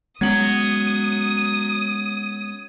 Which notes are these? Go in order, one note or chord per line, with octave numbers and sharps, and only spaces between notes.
F#3 G#3 B3 C#4 D#6 G#6 F#7